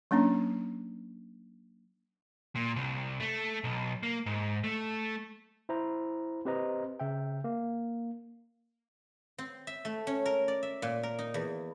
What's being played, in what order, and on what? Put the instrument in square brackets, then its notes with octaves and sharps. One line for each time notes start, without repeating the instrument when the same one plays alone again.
[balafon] F#3 A#3 C#4 D4
[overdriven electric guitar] A#2
C2
A3
B1
A#3
G#2
A3
[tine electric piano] E4 C5 A#5
C4 G4 B4 C5 D#5 A#5
C#3 E5 G5
A#3
[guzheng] C4
E5
A3
C#4
A#4
D5
E5
A#2
A#4
D#4
E2